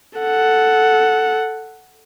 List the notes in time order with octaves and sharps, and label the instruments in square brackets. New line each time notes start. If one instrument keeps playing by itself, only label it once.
[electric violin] A4 F#5